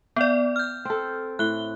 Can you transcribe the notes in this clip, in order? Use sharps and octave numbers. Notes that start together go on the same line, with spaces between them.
B3 D5 F5 G5
F6 G6
C4 A4
A2 F#6 G7